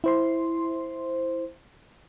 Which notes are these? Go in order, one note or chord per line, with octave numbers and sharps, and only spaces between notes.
E4 C5 C6